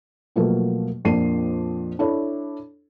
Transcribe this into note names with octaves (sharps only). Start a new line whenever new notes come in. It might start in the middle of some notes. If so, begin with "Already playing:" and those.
B2 F3 F#3 A3 A#3
A#1 F2 A#3 D4 C7 D#7
D4 E4 A4 C#5